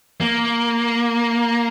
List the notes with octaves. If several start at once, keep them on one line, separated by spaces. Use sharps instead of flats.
A#3